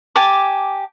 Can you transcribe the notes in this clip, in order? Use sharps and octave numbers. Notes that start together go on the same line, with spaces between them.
G4 G#5 A5 D6